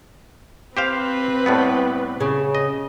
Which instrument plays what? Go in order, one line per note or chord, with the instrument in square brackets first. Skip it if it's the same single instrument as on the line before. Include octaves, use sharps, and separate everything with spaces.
[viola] C4 B4 [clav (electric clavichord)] G4 C5 F5
[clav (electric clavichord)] A2 G3 B3
[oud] C#3
[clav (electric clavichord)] D#5